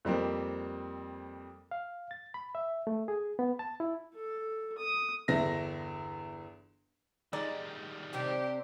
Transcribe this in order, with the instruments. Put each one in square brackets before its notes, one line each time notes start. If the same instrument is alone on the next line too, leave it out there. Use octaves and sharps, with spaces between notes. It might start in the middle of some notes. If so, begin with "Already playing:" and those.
[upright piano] F2 G3 A#3 C4
[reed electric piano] F5
A6
B5
E5
A3
G#4
B3
A5
E4
[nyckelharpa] A4
D#6
[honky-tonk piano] G1 E2 E4 A#6
[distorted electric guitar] D#3 G3 [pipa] G#3 D#4 D5
[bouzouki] C3 C4 D4 [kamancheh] G4